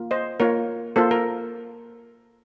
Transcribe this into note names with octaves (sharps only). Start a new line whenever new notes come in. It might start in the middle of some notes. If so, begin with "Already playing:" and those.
Already playing: A#3 F4
C5 D#5
A#3 F4 A#4 C#5
A#3 F4 A4 C5
A#4